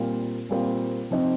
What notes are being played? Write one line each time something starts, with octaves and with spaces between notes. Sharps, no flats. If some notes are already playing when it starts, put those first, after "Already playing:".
Already playing: A#2 G3 C4 F4 A#4
A#2 G3 C4 F4 A#4
C3 F3 C4 D#4